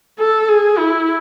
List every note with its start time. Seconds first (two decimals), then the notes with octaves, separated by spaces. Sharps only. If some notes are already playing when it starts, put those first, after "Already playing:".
0.19 A4
0.48 G#4
0.78 E4